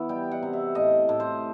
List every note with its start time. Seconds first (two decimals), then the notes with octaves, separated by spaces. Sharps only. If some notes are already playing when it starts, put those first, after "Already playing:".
Already playing: E3 B3
0.09 G3 G5
0.31 F#5
0.42 C3
0.53 E5
0.75 A2 D#5
1.09 A2
1.20 C5